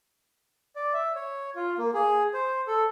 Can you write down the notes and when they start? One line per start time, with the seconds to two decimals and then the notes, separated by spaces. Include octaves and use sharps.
0.76 D5
0.94 E5
1.15 C#5
1.56 F4
1.78 A#3
1.94 G#4
2.34 C5
2.68 A4